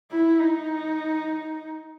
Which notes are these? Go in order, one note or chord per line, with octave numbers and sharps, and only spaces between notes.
E4
D#4